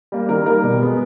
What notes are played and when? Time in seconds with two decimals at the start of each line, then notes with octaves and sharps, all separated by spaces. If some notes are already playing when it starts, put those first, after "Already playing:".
0.12 G3 A#3
0.29 D#3 A#4
0.46 G3 A#3 A#4
0.63 B2
0.81 G#3 B3